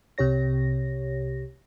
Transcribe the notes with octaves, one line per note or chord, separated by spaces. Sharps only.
C2 C3 G4 C#5 A#6